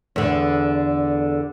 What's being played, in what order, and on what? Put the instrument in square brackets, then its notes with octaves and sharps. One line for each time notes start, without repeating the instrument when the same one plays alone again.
[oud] E2 D3